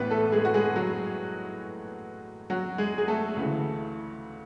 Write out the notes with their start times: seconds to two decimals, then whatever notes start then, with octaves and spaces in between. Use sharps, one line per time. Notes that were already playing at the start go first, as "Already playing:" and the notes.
Already playing: A1 A2 E3 B3 B4
0.11 A3 A4
0.32 G#3 G#4
0.45 F#4
0.54 G#3 G#4
0.76 F#3 F#4
2.50 F#3 F#4
2.78 G#3 G#4
2.98 G#4
3.08 A3 A4
3.37 D2 C#3 E3